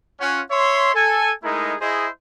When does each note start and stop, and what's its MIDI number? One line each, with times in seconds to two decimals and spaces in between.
0.21 0.42 61
0.21 0.42 65
0.21 0.42 78
0.51 0.91 73
0.51 0.91 76
0.51 0.91 84
0.94 1.32 69
0.94 1.32 80
1.44 1.74 56
1.44 1.74 57
1.44 1.74 63
1.44 1.74 64
1.44 1.74 68
1.44 1.74 70
1.81 2.07 64
1.81 2.07 68
1.81 2.07 72
1.81 2.07 75